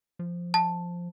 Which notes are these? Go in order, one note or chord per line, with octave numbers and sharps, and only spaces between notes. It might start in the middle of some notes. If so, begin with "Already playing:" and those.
F3
A5